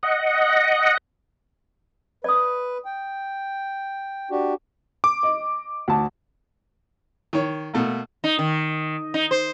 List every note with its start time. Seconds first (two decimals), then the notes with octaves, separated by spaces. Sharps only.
0.03 D#5 F#5
2.24 B4 D5 D#6
2.85 G5
4.31 D4 F#4 G4
5.04 D6
5.23 D#5
5.88 D2 A5
7.33 D#3 C#5
7.74 B2 A3 A#3
8.24 D#4
8.39 D#3
9.14 D#4
9.31 C5